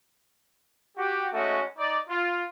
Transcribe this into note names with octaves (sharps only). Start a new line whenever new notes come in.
F#4 G4
G#3 A3 C#4 D#4 F#4
D#4 D5
F4